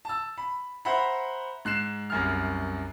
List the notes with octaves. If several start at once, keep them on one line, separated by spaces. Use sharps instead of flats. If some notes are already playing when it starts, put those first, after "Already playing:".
A5 E6
B5
C5 E5 F#5 A#5 B5
G#2 F#6 C7 E7
C2 F#2 F6